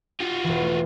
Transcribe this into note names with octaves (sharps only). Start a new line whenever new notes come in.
F4 F#4
E1 E3
A3